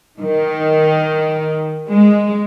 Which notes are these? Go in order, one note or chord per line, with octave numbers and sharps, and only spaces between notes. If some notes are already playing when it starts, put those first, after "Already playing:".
D#3
G#3